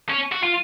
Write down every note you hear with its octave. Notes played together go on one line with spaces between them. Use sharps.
C#4
F#4
F4